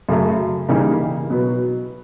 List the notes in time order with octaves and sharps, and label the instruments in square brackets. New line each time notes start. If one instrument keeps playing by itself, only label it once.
[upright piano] F#2 C#3 F#3 A3
C#3 E3 G3 A#3 D#4
B2 F#3 B3